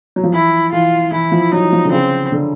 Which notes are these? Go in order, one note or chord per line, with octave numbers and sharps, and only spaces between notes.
F#3
F3
E3 E4
E3 F4
E3 E4
F3
F#3 D#4
F3
D3
C#3 C4
D3